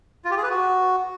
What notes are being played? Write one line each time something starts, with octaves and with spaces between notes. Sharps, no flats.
F4
G4
G#4
B4
F#4